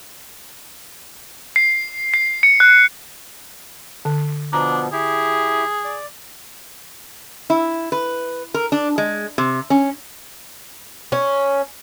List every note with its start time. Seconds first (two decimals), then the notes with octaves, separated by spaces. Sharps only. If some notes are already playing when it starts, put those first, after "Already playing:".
1.56 C7
2.14 C7
2.43 C#7
2.60 F#6
4.05 D3
4.53 B2 F3 B3 D4 A#5
4.92 E4 G4 G#4
5.85 D5
7.50 E4
7.92 B4
8.54 A#4
8.72 D4
8.98 G#3
9.38 C3
9.70 C#4
11.12 C#4